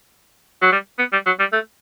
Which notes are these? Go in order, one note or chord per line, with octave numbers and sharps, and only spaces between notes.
F#3
G3
B3
G3
F#3
G3
A3